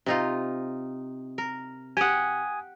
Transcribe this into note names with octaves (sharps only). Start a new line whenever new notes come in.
C3 D#4 F4
A#4
G4 F#5 G#5 D#6